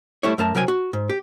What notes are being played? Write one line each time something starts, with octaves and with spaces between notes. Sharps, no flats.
G3 A3 E4 C#5
F#2 A3 A#4 A5
C2 F#3 A#4 G5 G#5
F#4
G#2
G4